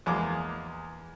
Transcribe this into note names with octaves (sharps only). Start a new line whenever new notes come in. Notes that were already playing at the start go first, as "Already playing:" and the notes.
E2 G#3 A#3 D6